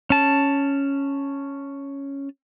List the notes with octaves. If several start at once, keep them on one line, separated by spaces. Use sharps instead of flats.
C#4 A5